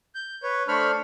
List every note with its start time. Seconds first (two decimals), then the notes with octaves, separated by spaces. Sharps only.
0.15 G6
0.43 B4 C#5
0.68 A3 D4 C5 B5 C#6 F6